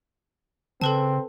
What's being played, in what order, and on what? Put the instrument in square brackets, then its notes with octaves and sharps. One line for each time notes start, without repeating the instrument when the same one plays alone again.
[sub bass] C#3 [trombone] C4 [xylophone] A4 B4 A5